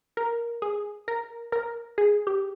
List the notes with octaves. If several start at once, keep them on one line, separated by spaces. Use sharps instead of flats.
A#4
G#4
A#4
A#4
G#4
G4